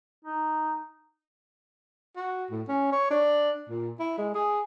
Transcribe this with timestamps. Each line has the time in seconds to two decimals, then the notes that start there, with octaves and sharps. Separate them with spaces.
0.25 D#4
2.16 F#4
2.51 A2
2.68 C#4
2.92 C#5
3.11 D4
3.69 A#2
3.99 E4
4.18 G#3
4.34 G#4